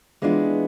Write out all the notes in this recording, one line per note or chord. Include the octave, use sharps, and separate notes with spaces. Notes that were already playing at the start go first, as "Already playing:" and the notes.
E3 G#3 B3 D4 F4